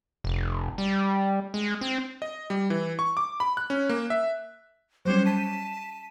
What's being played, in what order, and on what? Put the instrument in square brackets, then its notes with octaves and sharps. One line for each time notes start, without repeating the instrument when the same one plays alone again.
[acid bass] F1
G3
G#3
C4
[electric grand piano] D#5
G3
E3
C#6
D6
B5
F#6
C#4
A#3
E5
[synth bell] F#3 G3 C#4 [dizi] C5
[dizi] A5 [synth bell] B6 D#7